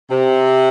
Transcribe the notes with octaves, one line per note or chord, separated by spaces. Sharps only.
C3